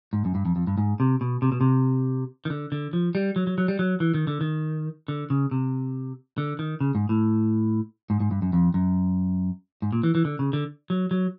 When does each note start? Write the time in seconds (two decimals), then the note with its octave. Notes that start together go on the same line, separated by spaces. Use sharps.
0.13 G#2
0.25 F#2
0.35 G2
0.46 F2
0.56 F2
0.67 G2
0.78 G#2
1.00 C3
1.21 B2
1.42 C3
1.52 B2
1.61 C3
2.45 D#3
2.50 D3
2.72 D3
2.93 F3
3.15 G3
3.36 F#3
3.47 F#3
3.58 F#3
3.68 G3
3.79 F#3
4.00 E3
4.14 D#3
4.27 D3
4.41 D#3
5.08 D3
5.30 C#3
5.51 C3
6.38 D3
6.59 D#3
6.81 C#3
6.95 G#2
7.09 A2
8.10 G#2
8.20 G#2
8.31 G2
8.42 F#2
8.53 F2
8.74 F#2
9.82 G#2
9.93 A#2
10.03 E3
10.15 E3
10.25 D3
10.39 C#3
10.53 D3
10.90 F#3
11.11 F#3